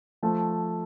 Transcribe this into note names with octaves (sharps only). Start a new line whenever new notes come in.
F3 A3